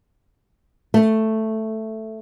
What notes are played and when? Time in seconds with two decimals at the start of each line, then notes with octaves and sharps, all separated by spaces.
0.94 A3